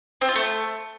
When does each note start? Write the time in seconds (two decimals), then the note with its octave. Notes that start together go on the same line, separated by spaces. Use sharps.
0.21 C4
0.28 F4
0.36 A3